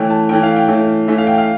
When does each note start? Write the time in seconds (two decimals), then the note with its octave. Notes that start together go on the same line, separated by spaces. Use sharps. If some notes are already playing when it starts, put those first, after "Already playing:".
Already playing: E3 A3 C#4 G5
0.10 A5
0.29 E3 A3 C#4 G5
0.43 F5
0.56 G5
0.68 E3 A3 C#4
1.08 E3 A3 C#4 E5
1.18 F5
1.27 G5
1.38 F5